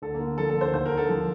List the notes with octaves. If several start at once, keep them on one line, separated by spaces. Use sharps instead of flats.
D2 A4
A#3
D3
F3 A4
A4
D2
C5
D#2 C5
A#4
D3
A4
F3